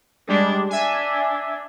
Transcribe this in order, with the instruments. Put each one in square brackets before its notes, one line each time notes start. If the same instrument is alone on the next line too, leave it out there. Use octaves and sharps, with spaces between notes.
[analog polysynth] G3 G#3 [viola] D4
[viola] D4 [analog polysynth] E5 G#5